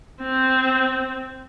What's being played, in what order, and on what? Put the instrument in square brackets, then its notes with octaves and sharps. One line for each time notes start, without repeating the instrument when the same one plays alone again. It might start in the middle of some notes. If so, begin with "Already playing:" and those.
[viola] C4